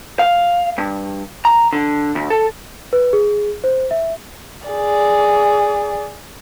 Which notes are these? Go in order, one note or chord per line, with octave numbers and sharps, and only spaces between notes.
F5
G2
A#5
D3
D2
A4
B4
G#4
C5
E5
G#4 D5